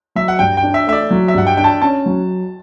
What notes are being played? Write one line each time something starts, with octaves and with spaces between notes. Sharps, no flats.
F#3 E5
F#5
G2 G5
G5
D4
E5
A3 E5
D5
F#3
E5
G2 F#5
G5
D4 G5
A5
C#4 A5
F#3